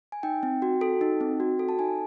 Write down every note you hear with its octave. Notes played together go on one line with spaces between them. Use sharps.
G#5
D#4 G5
C4
F#4
A4
D#4
C4
F#4
A4
A5
D#4 G#5